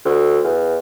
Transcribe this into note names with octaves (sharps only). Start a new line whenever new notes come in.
D2
E2